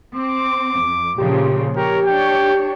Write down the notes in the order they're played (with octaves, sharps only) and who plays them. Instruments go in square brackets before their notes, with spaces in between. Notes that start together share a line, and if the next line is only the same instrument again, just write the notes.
[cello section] C4 [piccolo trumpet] D6
[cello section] F2
[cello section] A#2 C#3 F3 [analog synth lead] G4
[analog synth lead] G4 [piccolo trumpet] A#4 [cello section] C#5
[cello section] D4 C#5 [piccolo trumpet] G5